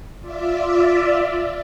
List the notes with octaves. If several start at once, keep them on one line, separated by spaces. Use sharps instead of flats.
F4 D5 E5